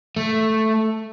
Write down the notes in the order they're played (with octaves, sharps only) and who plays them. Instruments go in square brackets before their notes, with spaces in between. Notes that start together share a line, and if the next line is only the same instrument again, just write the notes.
[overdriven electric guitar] A3